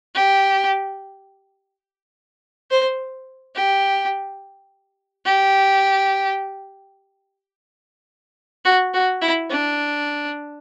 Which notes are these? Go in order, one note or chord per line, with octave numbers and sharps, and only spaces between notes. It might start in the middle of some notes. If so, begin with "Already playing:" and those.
G4
C5
G4
G4
F#4
F#4
E4
D4